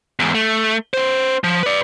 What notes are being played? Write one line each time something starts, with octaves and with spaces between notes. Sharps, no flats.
E2 G#2
A3
C#4 C5
F3
B4 D5